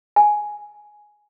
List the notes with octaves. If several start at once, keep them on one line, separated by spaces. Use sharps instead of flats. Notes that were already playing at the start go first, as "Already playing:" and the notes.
G#5